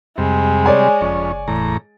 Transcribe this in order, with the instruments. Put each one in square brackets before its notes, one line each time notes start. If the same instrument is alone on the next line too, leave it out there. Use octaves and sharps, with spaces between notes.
[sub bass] F2 [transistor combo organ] C3 G3 [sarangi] G#3
[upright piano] C#5 D5 G#5
[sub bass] F#1 [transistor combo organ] F2 C#4
[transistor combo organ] E2 A2 A#5